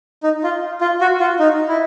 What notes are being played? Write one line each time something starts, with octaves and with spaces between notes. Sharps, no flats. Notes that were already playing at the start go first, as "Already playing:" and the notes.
D#4
F4
F4
F#4
F4
D#4
E4